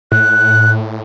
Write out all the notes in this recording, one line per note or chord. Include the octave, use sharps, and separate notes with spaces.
A2 F#6